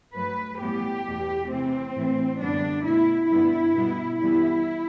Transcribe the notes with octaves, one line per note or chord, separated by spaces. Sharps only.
G2 F#3 A3 B4
A2 E3 G3 B3 G4
E2 B2 A3
C3 E3 A3 C4
A2 E3 A3
F#2 D3 G3 B3 D4
B2 A3 E4
G2 D3 G3 B3 E4
B2 G3 B3
G2 E3 G3 B3 E4